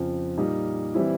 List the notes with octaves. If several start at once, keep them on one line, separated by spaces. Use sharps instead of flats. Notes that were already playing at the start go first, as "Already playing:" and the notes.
Already playing: F2 C#3 F3
A#2 G3 A#3 D#4
E3 G3 C4 E4